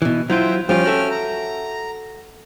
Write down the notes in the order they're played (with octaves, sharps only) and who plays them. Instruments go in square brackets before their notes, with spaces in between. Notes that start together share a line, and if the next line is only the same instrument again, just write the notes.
[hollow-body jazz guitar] B2 E3
[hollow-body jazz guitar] F#3 E4 F4 [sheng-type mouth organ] C5 E5 G5
[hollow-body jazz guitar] F3 G3 F4 [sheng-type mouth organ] C#4 G5 F6
[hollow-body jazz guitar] F#4 A4 E5
[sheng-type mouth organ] A#5